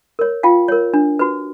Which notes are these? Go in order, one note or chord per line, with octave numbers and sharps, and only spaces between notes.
A#4 C#5
F4 F5 G5
A#4 C#5
D4
F#4 B4